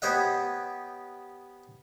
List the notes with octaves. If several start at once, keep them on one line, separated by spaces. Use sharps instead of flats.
B3 G4 C5 C#5 D#5 F#5